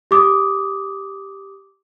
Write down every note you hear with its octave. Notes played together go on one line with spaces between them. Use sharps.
G4 D6 D#6